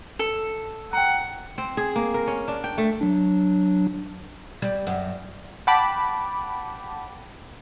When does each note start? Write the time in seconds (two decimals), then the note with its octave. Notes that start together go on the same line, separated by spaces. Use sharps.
0.19 A4
0.93 F#5 G5 A#5
1.58 C4
1.77 G#4
1.96 A#3
2.14 A#4
2.27 C#4
2.48 D4
2.64 G5
2.78 A3
3.01 F#3 D4
4.62 G3
4.87 F#2
5.67 F#5 G5 A5 B5 D6